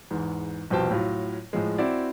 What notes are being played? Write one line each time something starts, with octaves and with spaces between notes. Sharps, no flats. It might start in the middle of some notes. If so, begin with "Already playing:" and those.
E2 G#2
C2 F2 B2 C5 G5 A5
A2 F#3 F4
A2 F3 G#3
C4 E4 F#4 D5